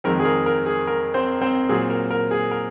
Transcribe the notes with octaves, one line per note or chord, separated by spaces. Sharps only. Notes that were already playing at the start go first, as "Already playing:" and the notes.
F2 D#3 G#3 C4 A#4
G#4
A#4
A#4
G#4
A#4
C4 C5
C4 C5
A#2 F#3 C4 G#4
A#4
A#4
G#4
A#4